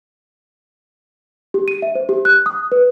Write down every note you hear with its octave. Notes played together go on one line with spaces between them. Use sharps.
G4
D#7
E5
C5
G4
F#6
D#6
B4